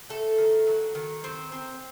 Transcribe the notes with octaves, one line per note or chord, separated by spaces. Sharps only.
A3 A4
D#3
F#3
D#3
C4 C5
C4